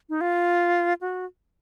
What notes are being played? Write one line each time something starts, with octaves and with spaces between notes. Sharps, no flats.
D#4
F4
F#4